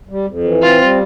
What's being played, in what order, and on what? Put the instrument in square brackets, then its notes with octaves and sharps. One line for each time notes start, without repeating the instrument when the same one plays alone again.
[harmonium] G3
F2
E3
[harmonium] C4 [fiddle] F4
[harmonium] G3